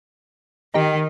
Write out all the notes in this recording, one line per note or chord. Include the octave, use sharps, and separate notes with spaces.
D#3 D#4 G4